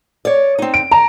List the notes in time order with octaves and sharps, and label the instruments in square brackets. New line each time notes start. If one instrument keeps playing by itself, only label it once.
[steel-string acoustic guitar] C#5 D5
C4 D#4
[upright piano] D7
[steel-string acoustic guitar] A5 [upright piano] A#5